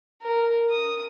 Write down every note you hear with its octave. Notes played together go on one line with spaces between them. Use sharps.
A#4
D#6